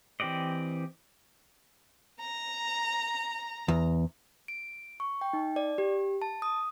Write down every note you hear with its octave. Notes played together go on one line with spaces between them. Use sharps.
E3 C4 G4 D5 D#5
A#5
E2
D7
C#6
G5
D#4
D5
G4
A5
D#6